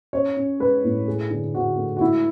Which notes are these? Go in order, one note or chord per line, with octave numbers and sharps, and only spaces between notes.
C#4 C#5
C#4
G#3 B4
A2
A3 G#4
D3
D3 F#4
A3
F#4
G#3 E4